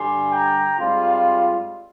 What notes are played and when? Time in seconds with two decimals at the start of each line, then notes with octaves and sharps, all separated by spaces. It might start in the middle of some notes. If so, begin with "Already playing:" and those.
Already playing: G2 D3 G3 G#5 C6
0.32 G5 A#5
0.78 G#2 G3 C4 F4